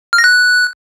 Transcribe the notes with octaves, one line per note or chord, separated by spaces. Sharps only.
F6
A#6
F#6